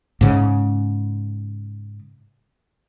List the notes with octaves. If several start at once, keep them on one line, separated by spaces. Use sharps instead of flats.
G#2 C#3